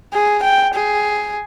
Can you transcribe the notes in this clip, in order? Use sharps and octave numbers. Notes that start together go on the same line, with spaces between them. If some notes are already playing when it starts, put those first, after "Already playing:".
G#4
G5
G#4